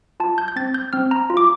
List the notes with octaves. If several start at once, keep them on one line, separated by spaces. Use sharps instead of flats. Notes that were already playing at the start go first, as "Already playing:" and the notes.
F4 A5
G6
G6
C4 A6
G6
C4 F6
A#5
F4
D6